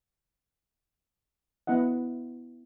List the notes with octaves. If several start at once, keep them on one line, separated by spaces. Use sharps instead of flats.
B3 E4 D#5 F#5